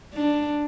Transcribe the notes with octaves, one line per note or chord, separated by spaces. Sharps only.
D4